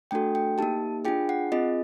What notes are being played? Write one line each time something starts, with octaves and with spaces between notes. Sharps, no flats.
A3 D4 F#4 A4 G5
G5
A#3 D#4 G4 A5
D4 F4 G#4 G5
F#5
C4 F4 G#4 D#5